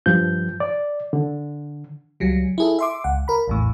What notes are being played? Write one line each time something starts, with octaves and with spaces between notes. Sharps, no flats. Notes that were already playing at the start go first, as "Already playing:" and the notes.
G2 F3 G6
D5
D3
C#2 F#3 G3
E4 G#4 A4
E5 C6 D6
C#2 F#5
A#4 B5
A#1 E2 A2